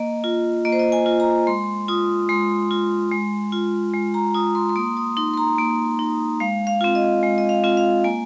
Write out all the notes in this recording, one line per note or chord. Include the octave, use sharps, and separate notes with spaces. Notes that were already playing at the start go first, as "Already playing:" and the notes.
Already playing: A#3 D#5
F4
A#3 D#5
C5
D#5
G#5
F4
A#5
G#3 C6
F4 D#6
G#3 C6
F4
G#3
F4
G#3
A#5
F4 D#6
C6
C6
A#3 D#6
D#6
D#4 C6
C6
A#5
A#3
D#4
G#3 F5
F5
C4 F4
D#5
G#3
D#5
F5
C4 F4
F5
A#3 G#5